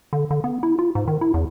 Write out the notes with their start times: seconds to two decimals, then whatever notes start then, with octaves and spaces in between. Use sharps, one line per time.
0.13 D3
0.31 D3
0.44 B3
0.63 E4
0.79 F4
0.95 G#2
1.08 D#3
1.21 E4
1.34 E2